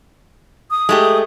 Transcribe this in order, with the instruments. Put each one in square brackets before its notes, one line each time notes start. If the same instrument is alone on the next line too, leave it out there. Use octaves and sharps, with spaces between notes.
[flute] D#6
[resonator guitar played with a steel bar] G#3 A3 G4